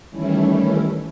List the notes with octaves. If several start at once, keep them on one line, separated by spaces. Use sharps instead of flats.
D#3 E3 G3 A3 C#4 E4